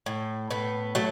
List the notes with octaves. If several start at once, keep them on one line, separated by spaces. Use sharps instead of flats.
A2
A2 B3
F#3 A3